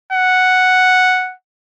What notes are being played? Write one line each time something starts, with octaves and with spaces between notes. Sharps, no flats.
F#5